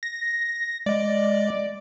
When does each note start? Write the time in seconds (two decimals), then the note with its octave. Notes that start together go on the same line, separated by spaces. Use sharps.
0.03 A#6
0.86 G#3 D5 D#5